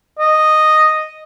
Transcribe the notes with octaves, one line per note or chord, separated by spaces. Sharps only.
D#5